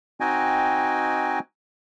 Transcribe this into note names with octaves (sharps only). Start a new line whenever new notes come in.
C4 D#4 F#4 D#5 G5 G#5